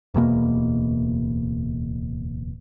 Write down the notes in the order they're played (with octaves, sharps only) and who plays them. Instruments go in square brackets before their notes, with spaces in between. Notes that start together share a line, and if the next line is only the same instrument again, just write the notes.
[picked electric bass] D1 E2 B2 A#3